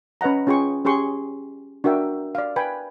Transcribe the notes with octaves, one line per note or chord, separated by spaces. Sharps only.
C#4 B4 D#5 F#5 A#5
C#4 F4 G#4 G5 C6 C#6
C#4 G4 G#4 C6 C#6
D4 F#4 A#4 E5 G5
D5 F5
B4 G5 G#5 B5